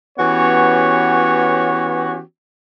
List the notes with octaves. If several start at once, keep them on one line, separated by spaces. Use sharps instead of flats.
E3 B3 C#4 F#4 G4 C#5